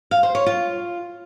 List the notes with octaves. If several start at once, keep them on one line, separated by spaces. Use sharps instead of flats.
F5
C5
C#5
F4